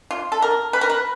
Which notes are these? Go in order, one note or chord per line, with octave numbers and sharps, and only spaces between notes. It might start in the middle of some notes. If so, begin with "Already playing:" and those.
F4
A4
A#4
B4
A#4
B4